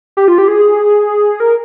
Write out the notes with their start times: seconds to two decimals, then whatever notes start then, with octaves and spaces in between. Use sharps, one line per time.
0.17 G4
0.28 F4
0.38 G4
0.48 G#4
1.40 A#4